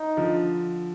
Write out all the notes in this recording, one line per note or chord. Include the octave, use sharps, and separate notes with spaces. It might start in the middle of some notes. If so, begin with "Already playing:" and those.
Already playing: D#4
D3 F3